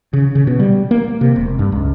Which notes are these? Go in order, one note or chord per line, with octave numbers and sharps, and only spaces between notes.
C#3
C#3
B2
G3
A#3
C3
E1
G2
C#2